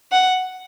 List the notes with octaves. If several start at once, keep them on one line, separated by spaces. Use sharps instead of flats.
F#5